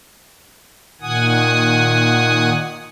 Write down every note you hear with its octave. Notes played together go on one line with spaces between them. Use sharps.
A#2 D#3 F#5 G#5 D#6